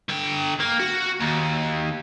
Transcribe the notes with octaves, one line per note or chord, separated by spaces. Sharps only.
D3 G5
A#3
F#4
D#2